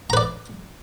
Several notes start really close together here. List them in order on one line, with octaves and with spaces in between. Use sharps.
A#5 B4 D5